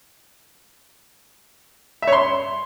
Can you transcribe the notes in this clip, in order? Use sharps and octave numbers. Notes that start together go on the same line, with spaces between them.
E5
C#5
C6